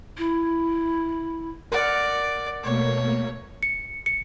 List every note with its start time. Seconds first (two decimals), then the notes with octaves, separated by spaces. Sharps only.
0.18 E4
1.72 A#4 D5 F#5
2.64 B2 A3 A#3 C#5
3.63 C#7
4.06 C#7